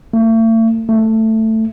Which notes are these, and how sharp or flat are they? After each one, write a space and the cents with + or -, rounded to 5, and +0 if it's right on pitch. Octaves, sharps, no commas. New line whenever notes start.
A3 +40
A3 +10